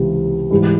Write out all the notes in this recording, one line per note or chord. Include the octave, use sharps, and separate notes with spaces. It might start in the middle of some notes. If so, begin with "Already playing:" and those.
Already playing: C#2 C3 E3
G#2 E3 G3